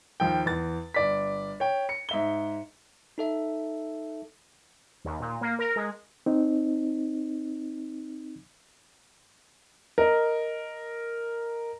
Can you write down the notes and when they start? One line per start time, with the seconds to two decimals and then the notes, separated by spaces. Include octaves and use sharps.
0.20 D#2 F3 G5
0.46 E2 A6
0.94 G1 D5 B6
1.60 C#5 G5
1.89 C#7
2.09 G#2 E5 G7
3.18 D#4 A4 E5
5.05 D#2
5.20 A#2
5.41 A#3
5.59 A#4
5.76 G#3
6.26 C4 D#4
9.98 A#4 D#5